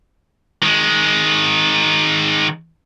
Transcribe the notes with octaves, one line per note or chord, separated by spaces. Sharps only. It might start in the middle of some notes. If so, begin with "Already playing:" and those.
D#3 G#3